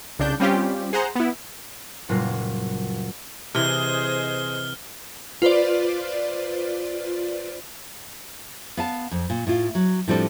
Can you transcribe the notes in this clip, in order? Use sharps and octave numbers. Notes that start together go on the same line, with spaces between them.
C2 C#3 D4 G6
G3 C4 C#4 F4 G4
G#4 C5 F#5 A#5
B3 E4
F#1 A#2 G3 F4 B4 A#6
C3 E3 G#4 C5 D#5 F6 G7
F4 B4 C5 D5
B3 F5 A5
F2
A#2
A2 F4
F#3
A2 F3 G3 C4 D4 A4